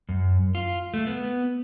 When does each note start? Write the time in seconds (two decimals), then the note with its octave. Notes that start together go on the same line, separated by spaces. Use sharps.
0.09 F#2
0.55 F4
0.94 A3
1.07 B3